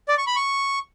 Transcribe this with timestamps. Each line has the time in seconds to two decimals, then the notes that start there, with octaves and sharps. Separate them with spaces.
0.09 D5
0.18 C#6
0.27 B5
0.36 C#6